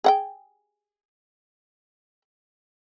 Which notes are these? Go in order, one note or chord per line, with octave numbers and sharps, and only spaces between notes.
G#4 F#5 G5